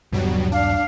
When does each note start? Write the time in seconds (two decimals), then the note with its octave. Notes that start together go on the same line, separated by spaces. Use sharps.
0.13 D#1 G2 B2 F#3 G3
0.52 D4 F5